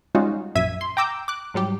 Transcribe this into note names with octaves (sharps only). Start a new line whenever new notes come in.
G3 G#3 C#4 D#4 F4 F#4
A#1 F#2 E5 G#6 B6 D#7
C6
G5 A#5 D6 E6 G6
D6 F#6
G#2 F#3 G3 G4